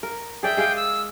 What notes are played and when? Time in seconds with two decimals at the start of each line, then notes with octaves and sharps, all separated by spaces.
0.03 A#4
0.43 G#4 D5 E5 G5
0.57 G#3 G#4 F5
0.76 E6